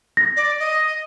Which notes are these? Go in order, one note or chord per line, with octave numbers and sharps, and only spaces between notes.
A#6
D5
D#5